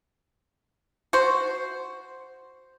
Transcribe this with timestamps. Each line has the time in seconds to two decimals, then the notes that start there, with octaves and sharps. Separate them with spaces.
1.13 F#4 C5